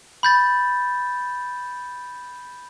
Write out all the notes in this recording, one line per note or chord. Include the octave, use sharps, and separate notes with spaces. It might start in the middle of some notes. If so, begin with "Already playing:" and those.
B5 G6 A6